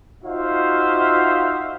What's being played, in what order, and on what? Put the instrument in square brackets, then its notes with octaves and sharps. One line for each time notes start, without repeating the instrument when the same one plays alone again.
[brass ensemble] D#4 F4 F#4 C5 E5 F5